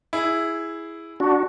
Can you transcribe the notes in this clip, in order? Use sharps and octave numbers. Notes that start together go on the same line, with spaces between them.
E4 G#4
D4 F#4